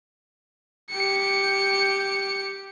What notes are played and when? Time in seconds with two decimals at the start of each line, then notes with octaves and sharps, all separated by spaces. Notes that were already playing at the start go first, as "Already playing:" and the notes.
0.91 G4 C#7